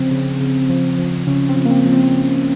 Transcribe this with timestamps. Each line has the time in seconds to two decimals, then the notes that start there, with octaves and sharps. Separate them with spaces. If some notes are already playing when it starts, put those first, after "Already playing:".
Already playing: C#3 F3 C4
0.11 C#3
0.40 C#3
0.69 F3
0.98 F3
1.27 C#3 C#4
1.49 C4
1.56 F3
1.65 A#3
1.71 C4
1.86 F3
1.93 C4